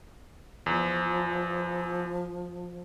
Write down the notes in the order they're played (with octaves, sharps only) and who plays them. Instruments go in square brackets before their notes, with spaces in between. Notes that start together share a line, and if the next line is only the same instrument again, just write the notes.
[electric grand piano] E2 [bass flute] F3